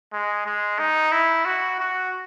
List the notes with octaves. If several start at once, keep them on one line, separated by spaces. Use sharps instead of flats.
G#3
G#3
D#4
E4
F#4
F#4